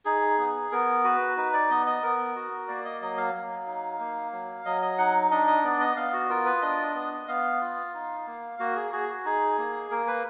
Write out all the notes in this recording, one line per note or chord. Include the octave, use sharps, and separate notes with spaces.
D#4 G#4
B3
B3 A#4
F#4 B4
D#4 B4
D5
B3 D#5
D#5
B3 A#4
F#4
A#3 D5
D#5
F#3 D#5
F5
F#3
D#4
A#3
F#3
F#3 D#5
D#5
D#4 F#5
D4 D#5
D#5
B3 D5
D#5
B3 F5
F#4
F4 A#4
B4
D4 D#5
B3
B3 F5
F4
D#4
A#3
A#3 F#4
G#4
F#4 G#4
F#4
D#4 G#4
A#3
A#3 A#4
B4